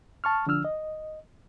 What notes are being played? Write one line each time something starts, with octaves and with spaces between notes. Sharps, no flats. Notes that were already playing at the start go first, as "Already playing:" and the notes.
A5 C#6 F6
D3 F3 D4 E6 F6
D#5